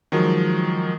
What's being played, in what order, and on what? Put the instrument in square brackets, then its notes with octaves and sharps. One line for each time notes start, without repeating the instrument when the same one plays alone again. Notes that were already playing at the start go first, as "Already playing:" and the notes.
[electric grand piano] D#3 F3 F#3 G#3